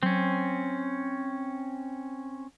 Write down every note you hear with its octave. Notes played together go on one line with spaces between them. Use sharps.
F#3 C4 C#4